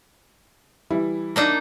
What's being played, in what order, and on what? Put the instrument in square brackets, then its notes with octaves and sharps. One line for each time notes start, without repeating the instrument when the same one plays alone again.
[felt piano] E3 G3 E4
[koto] A#3 D4 D#4